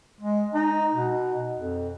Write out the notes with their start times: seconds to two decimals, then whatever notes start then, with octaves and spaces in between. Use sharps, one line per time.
0.20 G#3
0.54 D#4
0.94 B2
1.59 F2